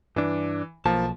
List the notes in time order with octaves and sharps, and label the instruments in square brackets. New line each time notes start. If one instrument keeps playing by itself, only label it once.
[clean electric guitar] G2 D4 [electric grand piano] E3
[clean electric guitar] B1 A5 [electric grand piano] F3 A#3